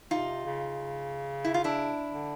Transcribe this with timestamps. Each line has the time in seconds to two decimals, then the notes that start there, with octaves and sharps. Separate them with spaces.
0.11 C3 D#4 F4
0.45 C#3
1.45 E4
1.54 F4
1.64 D4 E4
2.10 D3